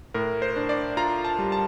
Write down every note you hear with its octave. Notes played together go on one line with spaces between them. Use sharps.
A2 A#4
C5
D4
D5
F4 A#5
A5
G3
A5